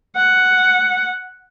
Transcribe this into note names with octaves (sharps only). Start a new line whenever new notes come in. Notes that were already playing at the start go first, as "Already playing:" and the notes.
F#5